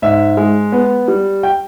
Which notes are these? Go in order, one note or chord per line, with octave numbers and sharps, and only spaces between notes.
G#2 E5
G#3
B3
G3
G5